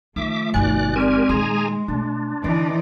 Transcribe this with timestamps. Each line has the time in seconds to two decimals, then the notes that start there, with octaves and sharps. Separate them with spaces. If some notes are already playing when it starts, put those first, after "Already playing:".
0.16 D#3 F3 A3 D#4 E5 D6
0.54 G1 B2 D#3 D5 G#5 F#6
0.96 G#3 C4 G4 A#4 D5 G#5
1.29 A#2 D#3 G#4 G#5 A#5 C6
1.88 B2 A3 D4
2.44 D3 E3 C#4 D#4 D5